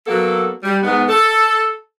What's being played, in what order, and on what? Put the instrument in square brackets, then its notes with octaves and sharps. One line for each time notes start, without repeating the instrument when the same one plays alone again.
[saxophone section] F#3 A#3 B3 A4
G3
G#2 B3
A4